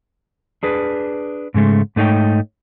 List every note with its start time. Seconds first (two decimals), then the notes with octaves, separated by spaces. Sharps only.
0.63 D4 G#4 B4
1.54 G#2 C#3 G#3 A3
1.96 G#2 A3 D#4 G#4 C#5 G5